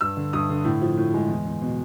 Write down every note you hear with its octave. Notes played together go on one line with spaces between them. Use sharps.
G2 E6
D3
G2 D#6
D3
A2
F3
A2
G#3
E2
E2
B2